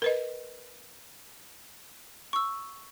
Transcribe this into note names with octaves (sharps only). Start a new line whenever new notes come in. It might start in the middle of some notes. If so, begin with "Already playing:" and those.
A#4 B4 D#5
C#6 E6